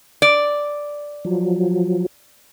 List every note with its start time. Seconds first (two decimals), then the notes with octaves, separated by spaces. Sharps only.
0.22 D5
1.25 F3 F#3